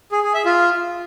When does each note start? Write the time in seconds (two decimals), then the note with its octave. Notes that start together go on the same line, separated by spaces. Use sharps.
0.12 G#4
0.23 G#4
0.34 E5
0.45 F4